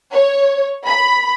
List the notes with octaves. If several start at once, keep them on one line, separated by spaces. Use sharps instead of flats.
C#5
B5